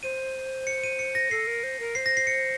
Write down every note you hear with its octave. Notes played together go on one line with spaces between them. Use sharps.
C5 D#7
C#7
D#7
C#7
A#6
A4 C7
A#4
C5
A#4
C5 C7
A#6
C7
C#7